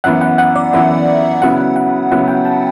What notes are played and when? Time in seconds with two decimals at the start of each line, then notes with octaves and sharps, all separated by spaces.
0.04 F#2 E3 B3 F#5
0.21 F#5
0.38 F#5
0.56 D5
0.73 F#2 E3 B3 E5
1.42 C#3 F#3 B3 E4 F#5
1.76 F#5
2.11 C#3 F#3 B3 E4 F#5
2.28 G5
2.45 A5